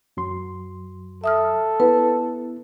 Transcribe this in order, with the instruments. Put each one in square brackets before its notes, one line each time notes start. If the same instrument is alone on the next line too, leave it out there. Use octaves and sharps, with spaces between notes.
[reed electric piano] F#2 F#3 C6
[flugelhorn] A4 [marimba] E5 D#6 F6
[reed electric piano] B3 E4 [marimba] B4